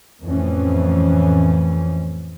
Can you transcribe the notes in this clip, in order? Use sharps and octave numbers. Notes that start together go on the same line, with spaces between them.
F2 A2 E3 C#4